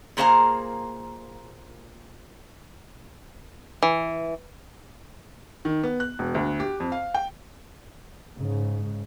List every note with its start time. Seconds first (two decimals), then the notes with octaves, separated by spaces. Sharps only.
0.17 A#2 A#3 G#4 C5 F5 A#5
3.83 E3
5.65 D#3
5.83 B3
6.00 F#6
6.19 E1
6.35 D2
6.60 G4
6.80 F2
6.92 F5
7.14 G5
8.36 G#2 C#3